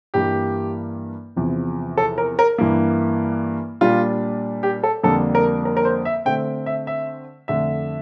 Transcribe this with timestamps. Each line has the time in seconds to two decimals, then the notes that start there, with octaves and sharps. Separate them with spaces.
0.14 G2 E3 G3 A#3 G4
1.36 E2 C3 F3
1.97 A4
2.18 A#4
2.39 A#4
2.58 G2 E3 A#3
3.81 A#2 G3 D4 F4
4.63 G4
4.83 A4
5.03 F2 D3 G3 A#3 D4 A4
5.35 A#4
5.65 A#4
5.77 A#4
5.85 C5
6.05 E5
6.25 D3 A3 C4 G5
6.66 E5
6.87 E5
7.48 F2 D3 A3 E5